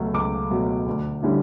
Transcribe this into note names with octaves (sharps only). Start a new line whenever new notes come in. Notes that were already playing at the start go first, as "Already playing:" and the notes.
Already playing: C#2 B2 F#3 A3
C#2 D6
B2 F#3 A3
D2
D3 G3 C#4 E4